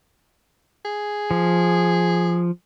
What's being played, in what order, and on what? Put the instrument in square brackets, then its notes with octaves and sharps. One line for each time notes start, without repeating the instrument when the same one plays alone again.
[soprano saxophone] G#4
[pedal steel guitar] F3